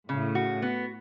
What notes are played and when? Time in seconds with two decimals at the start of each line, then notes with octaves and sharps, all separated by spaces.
0.09 A2 C#3
0.35 F#4
0.62 B3